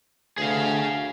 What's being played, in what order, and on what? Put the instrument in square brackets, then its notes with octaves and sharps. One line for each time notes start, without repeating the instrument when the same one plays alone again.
[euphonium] D2 [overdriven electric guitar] G#4 F5